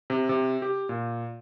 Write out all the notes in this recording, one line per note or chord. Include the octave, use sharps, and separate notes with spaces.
C3
C3
G4
A#2